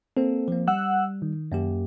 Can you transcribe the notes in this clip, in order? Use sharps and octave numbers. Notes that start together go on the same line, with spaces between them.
A#3 C4 A4
F3 A#3
G3 F#5 E6 F#6
D#3
F#2 A#3 G4